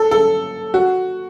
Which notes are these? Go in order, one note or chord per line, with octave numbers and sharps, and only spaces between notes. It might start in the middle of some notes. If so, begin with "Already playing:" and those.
Already playing: A4
A4
F#4